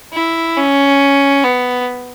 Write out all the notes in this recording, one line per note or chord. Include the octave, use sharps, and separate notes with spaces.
E4
C#4
B3